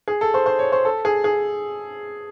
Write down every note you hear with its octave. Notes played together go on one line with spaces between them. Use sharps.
G#4
A4
C5
C5
C#5
C5
A4
G#4
G#4